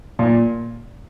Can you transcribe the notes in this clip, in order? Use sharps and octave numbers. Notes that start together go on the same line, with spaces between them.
A#2